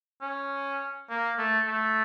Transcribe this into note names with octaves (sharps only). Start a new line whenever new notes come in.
C#4
A#3
A3
A3